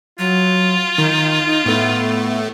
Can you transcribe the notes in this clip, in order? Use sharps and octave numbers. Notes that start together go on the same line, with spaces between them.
F#3 F4
D#3 D#4
D#4
A2 A3 B3